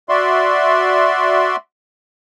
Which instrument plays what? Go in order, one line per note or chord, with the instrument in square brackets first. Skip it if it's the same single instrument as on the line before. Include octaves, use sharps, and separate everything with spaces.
[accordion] F#4 D5 E5 C6